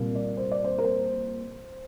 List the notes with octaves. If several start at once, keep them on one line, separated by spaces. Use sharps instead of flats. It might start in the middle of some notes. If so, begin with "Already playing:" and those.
Already playing: C2 A#2 G3 A#3
D5
C5
D5
C5
A#4
C5